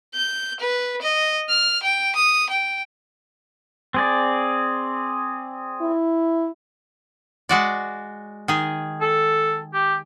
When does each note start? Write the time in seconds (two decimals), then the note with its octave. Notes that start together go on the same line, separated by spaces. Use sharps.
0.15 G6
0.60 B4
1.02 D#5
1.49 F6
1.83 G5
2.16 D#6
2.49 G5
3.94 C4 G#4 D5
5.81 E4
7.49 G#3 F#4 D5
8.48 D#3 G#4
9.01 A4
9.74 G4